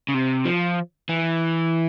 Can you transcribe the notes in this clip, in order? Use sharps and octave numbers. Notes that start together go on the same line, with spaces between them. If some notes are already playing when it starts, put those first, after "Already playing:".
C#3
C3
F3
E3